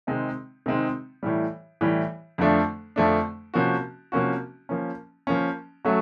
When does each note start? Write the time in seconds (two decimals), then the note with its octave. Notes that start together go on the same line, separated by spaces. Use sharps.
0.07 C3 D#3 G#3 C4 D#4
0.66 C3 D#3 G#3 C4 D#4
1.23 A2 E3 G3
1.81 A2 E3 G3
2.38 F2 D3 F3 A3 D4
2.96 F2 D3 F3 A3 D4
3.54 C3 F3 A#3 C#4 F#4
4.12 C3 F3 A#3 C#4 F#4
4.69 F3 A#3 C#4
5.27 F3 A#3 C#4
5.85 F#3 A3 C#4 F#4